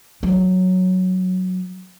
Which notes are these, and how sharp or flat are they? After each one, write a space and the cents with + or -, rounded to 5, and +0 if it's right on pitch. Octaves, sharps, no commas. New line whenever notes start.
F#3 -5